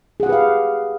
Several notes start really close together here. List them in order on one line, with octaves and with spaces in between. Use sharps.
G#4 F#5 G4 B4 F5